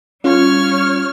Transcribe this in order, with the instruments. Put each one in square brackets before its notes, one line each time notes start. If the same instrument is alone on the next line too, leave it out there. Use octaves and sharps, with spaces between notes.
[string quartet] G3 F6 [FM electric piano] C#4 F4 [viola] C#5